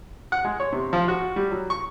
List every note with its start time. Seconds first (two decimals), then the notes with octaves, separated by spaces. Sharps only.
0.32 F#5
0.45 G#3
0.60 C#5
0.72 C3
0.93 F3
1.08 F#4
1.36 G3
1.52 F#3
1.70 C#6